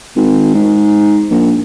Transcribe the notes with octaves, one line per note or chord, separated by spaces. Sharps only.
G#1
G#2
A#1